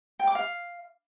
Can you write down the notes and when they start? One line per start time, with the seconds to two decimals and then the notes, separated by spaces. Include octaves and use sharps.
0.19 G5
0.27 D6
0.35 F5